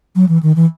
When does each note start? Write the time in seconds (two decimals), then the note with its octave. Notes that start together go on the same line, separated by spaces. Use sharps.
0.15 F#3
0.29 E3
0.43 D#3
0.56 E3